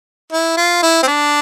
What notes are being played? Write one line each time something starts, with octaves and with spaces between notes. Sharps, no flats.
E4
F4
E4
C4
D4